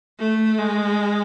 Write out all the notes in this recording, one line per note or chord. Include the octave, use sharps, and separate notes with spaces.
A3
G#3